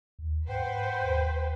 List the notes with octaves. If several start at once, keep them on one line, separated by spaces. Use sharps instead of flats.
D#2
G#2 B4 C5 F#5 G5
D#2